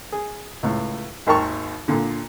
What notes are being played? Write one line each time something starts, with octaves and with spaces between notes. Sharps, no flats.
G#4
C#2 A2
G#1 D#2 A#4 G5 A5 C#6
A#2 D3